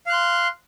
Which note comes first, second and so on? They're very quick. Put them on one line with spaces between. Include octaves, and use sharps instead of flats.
F5 F#6 C6